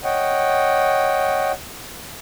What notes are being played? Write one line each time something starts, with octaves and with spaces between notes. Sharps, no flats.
C#5 D#5 F#5 G5